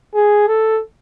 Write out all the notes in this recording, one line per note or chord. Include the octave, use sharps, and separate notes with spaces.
G#4
A4